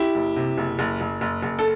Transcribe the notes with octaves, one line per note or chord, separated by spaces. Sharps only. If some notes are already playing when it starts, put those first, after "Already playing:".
Already playing: E4 G4
F#1
C3
F#1
F#1
F#1
F#1
F#1
A4